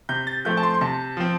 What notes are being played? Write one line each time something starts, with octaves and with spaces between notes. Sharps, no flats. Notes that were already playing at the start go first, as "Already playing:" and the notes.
C3 G6
A6
F3 A3 C4 G6
A5
C6
C6
C3 A5
F3 C4